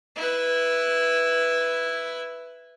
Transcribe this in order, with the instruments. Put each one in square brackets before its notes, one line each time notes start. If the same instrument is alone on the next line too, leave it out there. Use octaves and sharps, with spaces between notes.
[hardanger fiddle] E4 B4